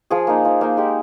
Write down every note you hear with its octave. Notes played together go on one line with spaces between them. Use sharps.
F3 G#4
A#3 D#4
F3
A#3 D#4
G#3 G4